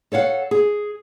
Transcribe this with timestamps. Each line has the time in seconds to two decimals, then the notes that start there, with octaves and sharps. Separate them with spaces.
0.12 A4 C#5 F5 F#5
0.51 G#4